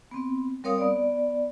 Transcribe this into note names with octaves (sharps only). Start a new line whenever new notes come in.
B3 C4
G3 C4 A#4 C#5 F5 D#6
B3 D5